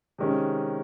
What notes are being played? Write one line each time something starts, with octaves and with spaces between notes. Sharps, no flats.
C3 D#3 G#3 C#4